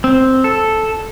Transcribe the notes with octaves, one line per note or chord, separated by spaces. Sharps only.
C4
A4